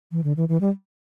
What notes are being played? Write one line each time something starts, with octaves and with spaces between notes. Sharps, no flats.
E3
D3
E3
E3
G3